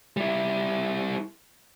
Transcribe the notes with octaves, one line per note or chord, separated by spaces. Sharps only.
G3 E4